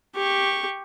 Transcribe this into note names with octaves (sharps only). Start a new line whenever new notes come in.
G4 C#6